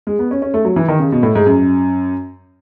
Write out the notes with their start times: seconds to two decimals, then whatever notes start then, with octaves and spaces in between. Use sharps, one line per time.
0.07 G#3
0.19 B3
0.31 C#4
0.42 C#4
0.54 A3
0.65 F#3
0.76 E3
0.88 D#3
1.00 C#3
1.12 B2
1.23 A2
1.35 G#2
1.46 F#2